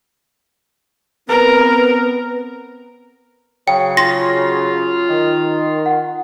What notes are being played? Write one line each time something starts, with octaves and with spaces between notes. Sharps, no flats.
B3 C4 A#4 B4
C#3 F#3 G5
F4 C6 A#6
D#3
F#5